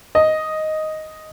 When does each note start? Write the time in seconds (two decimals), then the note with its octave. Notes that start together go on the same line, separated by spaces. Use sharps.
0.15 D#5